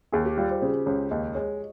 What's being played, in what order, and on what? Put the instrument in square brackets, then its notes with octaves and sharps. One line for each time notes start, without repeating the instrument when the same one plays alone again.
[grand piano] D#2 [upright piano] G#4
[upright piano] G4
[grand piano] G3 [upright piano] F4
[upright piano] C5
[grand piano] C#3 [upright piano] C5
[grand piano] C#2 [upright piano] C#5
[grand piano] D#2 [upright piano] D#5
[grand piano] G#3 [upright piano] C#5